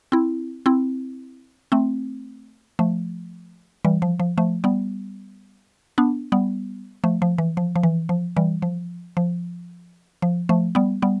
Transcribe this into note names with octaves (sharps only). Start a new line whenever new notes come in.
C4 E4
C4 E4
A3 C4
F3 A3
E3 G3
F3
F3
F3 A3
G3 B3
B3 D4
G3 B3
F3 A3
F3
E3
F3
F3
E3
F3
E3 G3
F3
F3
F3
F3 A3
G3 B3
G3 B3